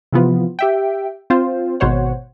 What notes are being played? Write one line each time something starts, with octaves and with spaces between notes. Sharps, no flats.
C3 E3 F3 B3 F4
G4 E5 G5
C4 F4 C5
G#1 B2 C5 C#5 F#5